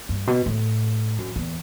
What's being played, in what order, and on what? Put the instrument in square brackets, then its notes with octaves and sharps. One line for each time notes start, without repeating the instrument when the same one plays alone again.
[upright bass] G2
B2
A2
F#2
E2